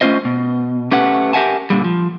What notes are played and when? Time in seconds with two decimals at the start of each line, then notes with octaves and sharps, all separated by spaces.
0.01 A3 C#4 D#4 F4 C5 D#5
0.25 B2
0.91 A3 C#4 G4 B4 F#5
1.33 G4 A#4 E5 F#5 G#5 A5
1.70 A#2 D3 G3
1.84 F3